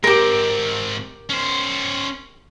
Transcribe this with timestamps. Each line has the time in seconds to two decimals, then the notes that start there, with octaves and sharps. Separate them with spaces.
0.04 G#2 C4 G4 A#4
1.29 C#4 C5